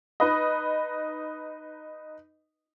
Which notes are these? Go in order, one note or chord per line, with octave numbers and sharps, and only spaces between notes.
D#4 B4 D#5